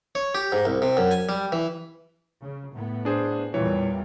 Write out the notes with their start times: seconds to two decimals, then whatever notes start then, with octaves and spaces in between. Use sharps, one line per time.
0.15 C#5
0.35 G4
0.52 G#2
0.65 C2
0.82 C3
0.97 F#2
1.11 G#5
1.29 G3
1.52 E3
2.41 C#3
2.73 A2 B3
3.05 D4 G#4 C5
3.54 E2 A#2 E3 G3 C#5